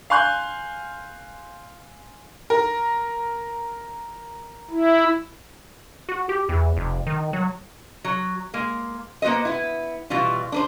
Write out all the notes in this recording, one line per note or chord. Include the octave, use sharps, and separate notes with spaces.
F5 G#5 C6 F#6 G6
A#4
E4
F#4
G4
E2
F1
D#3
F#3
F#3
G#3 A#3
A#3 B3 F#4 C5 D#5
B3 E4
B2 E3 G3 F4
D4 B4 C5